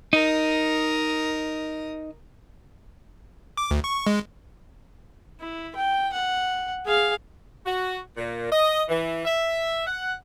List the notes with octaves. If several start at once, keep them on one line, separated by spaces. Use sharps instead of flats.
D#4 A#4 D#6
D6
D2
C#6
G#3
E4
G5
F#5
G#4 F5
F#4
A#2
D#5
E3
E5
F#5